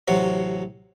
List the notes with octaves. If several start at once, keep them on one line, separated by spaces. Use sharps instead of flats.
A1 C3 F#3 F#4